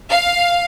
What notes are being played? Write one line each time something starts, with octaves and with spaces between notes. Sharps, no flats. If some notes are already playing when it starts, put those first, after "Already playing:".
F5